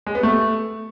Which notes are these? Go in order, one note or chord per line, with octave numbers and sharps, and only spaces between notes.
G#3
B3
A3